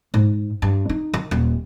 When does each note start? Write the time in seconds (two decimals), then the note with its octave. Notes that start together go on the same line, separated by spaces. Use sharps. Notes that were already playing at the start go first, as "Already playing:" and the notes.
0.14 G#2
0.62 G2
0.89 D#4
1.14 D#3
1.31 D#1